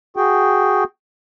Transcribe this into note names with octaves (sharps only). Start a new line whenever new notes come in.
F#4 G#4 G5